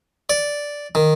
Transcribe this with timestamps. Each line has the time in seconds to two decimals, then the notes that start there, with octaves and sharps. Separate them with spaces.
0.30 D5
0.95 D#3